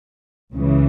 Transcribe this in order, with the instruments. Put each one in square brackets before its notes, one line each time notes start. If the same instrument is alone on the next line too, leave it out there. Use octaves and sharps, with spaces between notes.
[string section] C#2 C#3 E3